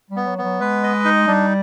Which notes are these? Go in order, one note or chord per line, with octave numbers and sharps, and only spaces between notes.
G3
B3
F#3
F#3 B3
G#3 B4
D#5
D#4
G3 D4